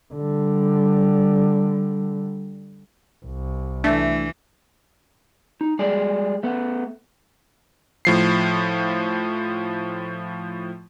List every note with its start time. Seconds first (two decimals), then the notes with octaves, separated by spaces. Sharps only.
0.14 D3 G3
3.25 C2
3.84 E3 A3 D4
5.61 D#4
5.79 G3 G#3 G#4 D5
6.43 A3 B3
8.05 A2 F3 C7